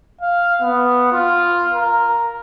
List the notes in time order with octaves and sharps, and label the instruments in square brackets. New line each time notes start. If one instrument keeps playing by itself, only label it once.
[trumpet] F5
B3
F4
A#4